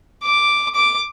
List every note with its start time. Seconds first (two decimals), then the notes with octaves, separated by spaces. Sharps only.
0.24 D6
0.75 D6